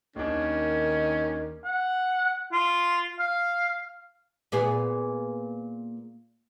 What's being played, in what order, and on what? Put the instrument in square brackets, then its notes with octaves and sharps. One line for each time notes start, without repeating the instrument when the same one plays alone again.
[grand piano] D#2 D4 [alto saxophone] D#3 [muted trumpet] C#4
[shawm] F#5
F4
F5
[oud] A#2 B3 G#4